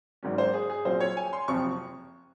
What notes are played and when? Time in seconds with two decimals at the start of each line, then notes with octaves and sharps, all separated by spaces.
0.23 G#1 G#2 F#3 A#3 C#4
0.38 C5
0.54 G#4
0.70 G#4
0.85 A#1 A#2 F#3 C4 C5
1.00 C#5
1.17 G#5
1.33 C6
1.48 F#1 F2 C3 F3 C#6